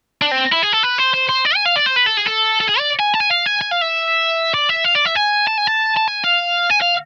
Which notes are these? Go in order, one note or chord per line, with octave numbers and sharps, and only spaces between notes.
D4
C4
E4
G#4
A4
B4
C5
C5
C5
D5
G#5
F5
D5
C5
B4
A4
G#4
A4
A4
G#4
D5
G#5
A5
G#5
F5
G#5
G#5
F5
E5
D5
E5
F5
D5
E5
G#5
A5
G#5
A5
A5
G#5
F5
G#5
F5